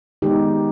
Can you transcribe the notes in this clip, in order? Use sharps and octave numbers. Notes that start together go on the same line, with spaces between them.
D#3 G#3 B3 D#4 G4